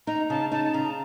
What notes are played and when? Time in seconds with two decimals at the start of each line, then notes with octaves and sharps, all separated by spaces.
0.07 D#4 A#5
0.30 C#3 A5
0.52 D#4 A5
0.65 A5
0.74 C#3 A#5